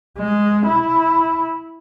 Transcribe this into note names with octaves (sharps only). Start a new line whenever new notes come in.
G#3
E4